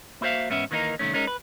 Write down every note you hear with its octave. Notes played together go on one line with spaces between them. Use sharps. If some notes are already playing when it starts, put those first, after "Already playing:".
A#3 E4 F#4 C5 E5 F5
E2 G#2 B3 C#4 E5
D#3 E3 A#3 D4 D#4 A#4
C2 D#3 A3 C#4
G#3 C#4 D#4 A#4
B4